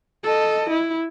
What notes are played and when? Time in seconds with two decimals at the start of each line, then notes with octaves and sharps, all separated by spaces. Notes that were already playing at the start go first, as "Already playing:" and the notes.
0.24 A4 D#5
0.70 E4